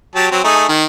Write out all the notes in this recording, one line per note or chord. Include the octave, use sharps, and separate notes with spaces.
F#3 G4 A5
F#3 C4
A3 D#4 G#4
D#3